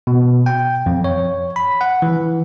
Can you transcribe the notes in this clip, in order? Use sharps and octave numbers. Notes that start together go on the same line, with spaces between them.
B2
G5
F2
C#5
B5
F#5
E3